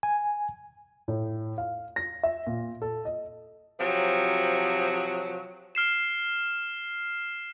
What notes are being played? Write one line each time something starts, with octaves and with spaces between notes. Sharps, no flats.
G#5
A2
F5
A#6
E5
A#2
A4
D#5
C3 F3 F#3
F6 C7 E7